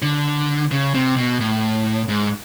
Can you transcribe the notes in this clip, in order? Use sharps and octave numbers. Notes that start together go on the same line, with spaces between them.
D3
C#3
C3
B2
A2
G#2